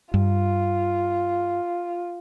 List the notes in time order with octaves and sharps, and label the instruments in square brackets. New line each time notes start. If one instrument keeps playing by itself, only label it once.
[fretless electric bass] G2 [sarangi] F4